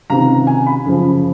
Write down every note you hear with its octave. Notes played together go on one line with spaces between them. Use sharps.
C#2 C3 D#3 A#5
G#5
B5
F#2 C#3 F3